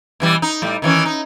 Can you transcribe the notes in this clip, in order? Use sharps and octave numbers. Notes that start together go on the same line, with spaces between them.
B2 E3 G3
D#4
A2 G3
D#3 E3 C#4
D#4